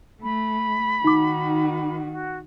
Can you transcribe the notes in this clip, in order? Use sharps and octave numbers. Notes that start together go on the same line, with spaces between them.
A3 B5
D#3 D#4 F#4 D6
F#4